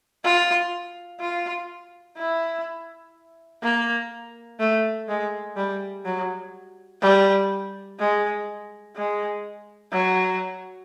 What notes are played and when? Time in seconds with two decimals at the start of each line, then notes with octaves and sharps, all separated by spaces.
0.24 F4
1.20 F4
2.18 E4
3.63 A#3
4.60 A3
5.08 G#3
5.57 G3
6.05 F#3
7.02 G3
7.99 G#3
8.96 G#3
9.93 F#3